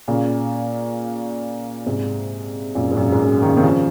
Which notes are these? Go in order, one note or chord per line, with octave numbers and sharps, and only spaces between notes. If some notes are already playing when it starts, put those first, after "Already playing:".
A#2 C#3
G#2 C3
F#2 A#2
G#2
F#2 A#2
G#2
F#2
D#3
C#3
C3 D#3
C#3 F3